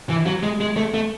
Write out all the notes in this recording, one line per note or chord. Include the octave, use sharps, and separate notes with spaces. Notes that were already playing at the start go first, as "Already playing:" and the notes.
E3
F#3
G#3
G#3
A3
A3